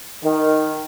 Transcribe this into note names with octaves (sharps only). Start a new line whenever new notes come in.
D#3